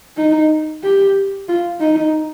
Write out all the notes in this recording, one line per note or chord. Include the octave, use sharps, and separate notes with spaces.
D#4
G4
F4
D#4